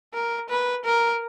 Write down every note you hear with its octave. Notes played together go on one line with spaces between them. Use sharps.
A#4
B4
A#4